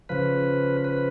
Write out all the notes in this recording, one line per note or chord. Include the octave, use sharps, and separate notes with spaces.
C#3 F3 B4
B4